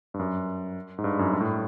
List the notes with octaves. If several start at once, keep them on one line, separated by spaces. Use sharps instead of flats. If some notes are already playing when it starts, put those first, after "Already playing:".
G2
F#2
G#2
G2
F#2
G2
A2